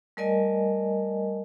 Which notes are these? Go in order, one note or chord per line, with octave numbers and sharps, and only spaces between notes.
G3 A3 A#4 D5 D#5 G#5